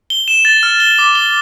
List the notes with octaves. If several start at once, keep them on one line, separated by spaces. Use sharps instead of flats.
G7
E7
A6
F6
G7
D6
G7